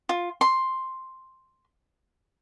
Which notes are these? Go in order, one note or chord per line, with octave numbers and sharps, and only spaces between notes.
F4
C6